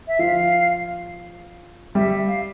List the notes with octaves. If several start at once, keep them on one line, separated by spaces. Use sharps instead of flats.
E5
F3 F5
G3 E5
F5